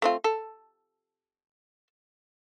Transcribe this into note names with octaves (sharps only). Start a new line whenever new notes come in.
A3 C4 F4
A4